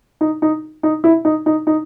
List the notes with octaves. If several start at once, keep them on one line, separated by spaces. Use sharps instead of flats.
D#4
D#4
D#4
E4
D#4
D#4
D#4